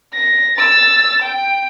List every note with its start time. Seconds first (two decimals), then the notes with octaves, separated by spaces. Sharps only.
0.13 A#6
0.56 E6 A6
1.22 G5